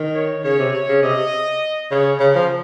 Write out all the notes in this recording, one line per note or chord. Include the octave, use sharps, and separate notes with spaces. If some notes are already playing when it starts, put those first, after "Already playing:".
Already playing: D#3
C#5
C#3 C#5
C3
C#5
C#3
C3 D#5
C#3 C#5
C#3 A#4
F3